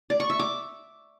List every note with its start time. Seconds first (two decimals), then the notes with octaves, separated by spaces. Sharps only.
0.10 D5
0.20 C#6
0.30 E5
0.39 D6